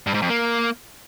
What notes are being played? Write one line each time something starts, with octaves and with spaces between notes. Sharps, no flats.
G2
G#2
F2
A#3